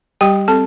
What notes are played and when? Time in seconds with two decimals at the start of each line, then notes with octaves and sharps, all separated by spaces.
0.21 G3 G4 G5
0.48 C4 A4 A5